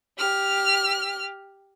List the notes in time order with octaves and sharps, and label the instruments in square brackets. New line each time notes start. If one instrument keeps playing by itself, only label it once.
[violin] G4 F6